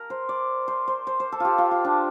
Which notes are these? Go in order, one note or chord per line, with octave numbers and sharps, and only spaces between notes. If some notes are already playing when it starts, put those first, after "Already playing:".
Already playing: A#4
C5
D5
C5
C5
C5
C5
A4
F4 G4
F4
F4
D4